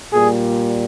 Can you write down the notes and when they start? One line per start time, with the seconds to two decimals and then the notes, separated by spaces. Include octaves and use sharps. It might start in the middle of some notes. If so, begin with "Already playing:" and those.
0.13 A#2 G3 G#4